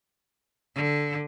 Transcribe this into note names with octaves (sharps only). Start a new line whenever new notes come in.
D3